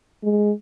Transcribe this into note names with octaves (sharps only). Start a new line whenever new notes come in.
G#3